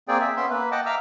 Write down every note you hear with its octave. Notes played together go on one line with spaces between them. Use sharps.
A#3 C4 G#4 D5 G5
E5
B3 C#4 E5 C6
A#3 B4
D#5 F#5 G5 A5 D6
E5 F5 A#5 D6 E6 F6